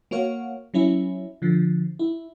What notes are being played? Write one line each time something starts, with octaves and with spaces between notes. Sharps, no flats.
A#3 F#4 C#5 F5
F#3 C#4 E4
D3 F3
E4